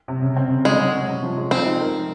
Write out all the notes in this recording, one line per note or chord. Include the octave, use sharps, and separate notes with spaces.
C3
C#3
C4
C#3
G#3 C#4
F#3
C#4
C3
F3
G#3
F3 C4
D#4
A#4